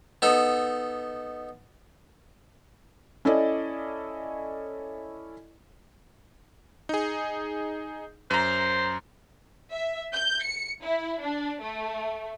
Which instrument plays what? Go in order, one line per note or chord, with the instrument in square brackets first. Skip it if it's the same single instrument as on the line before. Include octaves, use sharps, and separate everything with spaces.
[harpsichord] B3 D#4 A4
[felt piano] C#4 E4 A4 D5 D#5
[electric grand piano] D#4 G#4
[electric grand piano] F#2 A#5 [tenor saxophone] C5
[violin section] E5
G6
C#7
E4
D4
A3